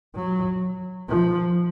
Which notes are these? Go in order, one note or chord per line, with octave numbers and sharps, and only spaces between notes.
F#3
F3